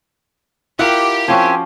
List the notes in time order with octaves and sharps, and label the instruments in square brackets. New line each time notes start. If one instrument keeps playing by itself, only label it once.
[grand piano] E4 F4 A#4 [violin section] G4 [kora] F#5
[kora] F3 C#4 F#4 [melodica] C4 G#5